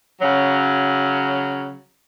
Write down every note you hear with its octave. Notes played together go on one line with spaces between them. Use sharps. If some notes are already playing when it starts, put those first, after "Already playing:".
C#3 F#3